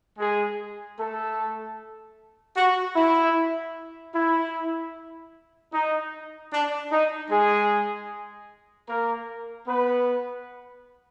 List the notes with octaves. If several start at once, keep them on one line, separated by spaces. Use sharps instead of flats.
G#3 G#4
A3 A4
F#4
E4
E4
D#4
D4
D#4
G#3 G#4
A#3 A#4
B3 B4